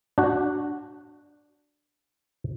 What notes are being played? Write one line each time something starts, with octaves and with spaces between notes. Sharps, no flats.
D4 F#4